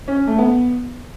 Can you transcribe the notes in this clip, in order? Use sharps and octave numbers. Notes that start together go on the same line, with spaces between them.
C#4
A3
B3